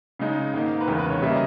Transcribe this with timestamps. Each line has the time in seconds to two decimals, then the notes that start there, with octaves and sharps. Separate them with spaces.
0.19 C#3 G#3 D#4
0.54 G#2 D#3 A#3
0.81 B4
0.88 E2 C#3 G#3 A#4
0.99 B4
1.10 C#5
1.22 C#3 G3 A#3 C#4 E5
1.31 D#5